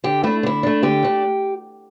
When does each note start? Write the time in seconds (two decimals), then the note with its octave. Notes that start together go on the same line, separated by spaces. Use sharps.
0.04 D3 G4
0.23 A3 D4 E4
0.43 D3 E4
0.63 A3 D4
0.83 D3 G4
1.03 A3 D4